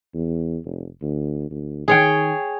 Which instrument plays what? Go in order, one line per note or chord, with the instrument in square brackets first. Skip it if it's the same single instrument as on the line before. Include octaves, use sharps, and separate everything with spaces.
[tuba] E2
F1
D2
D2
[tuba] D#3 [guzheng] G#4 C#5 G5